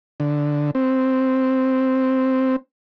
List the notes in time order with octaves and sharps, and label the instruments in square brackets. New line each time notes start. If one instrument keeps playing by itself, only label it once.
[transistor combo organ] D3
C4